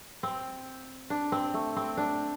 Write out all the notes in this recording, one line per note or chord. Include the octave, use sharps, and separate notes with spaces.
C4
D4
C4
A3
C4
D4